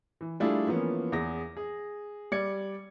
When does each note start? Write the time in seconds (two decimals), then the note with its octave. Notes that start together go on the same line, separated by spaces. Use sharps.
0.21 E3
0.40 G3 A3 D4 E4 F4 G#4
0.67 E3 F3 A#3 B3 C#4
1.12 E2 G#4 A#6
1.57 G#4
2.32 G3 D5 G#6 C#7